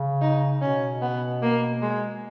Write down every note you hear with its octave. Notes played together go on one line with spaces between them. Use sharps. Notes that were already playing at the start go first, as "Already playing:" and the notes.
Already playing: C#3
D#4
B2 C#4
B3
A#3
G#3